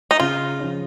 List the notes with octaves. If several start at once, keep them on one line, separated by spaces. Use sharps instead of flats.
D#4
C#3 F4
F3 C#4